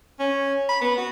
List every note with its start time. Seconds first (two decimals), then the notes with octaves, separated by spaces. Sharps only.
0.19 C#4
0.69 B5
0.81 B3
0.98 F#4